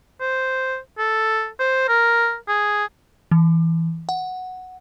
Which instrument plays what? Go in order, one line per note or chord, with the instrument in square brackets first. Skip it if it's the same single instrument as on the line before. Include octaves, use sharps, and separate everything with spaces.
[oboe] C5
A4
C5
A#4
G#4
[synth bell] E3
F#5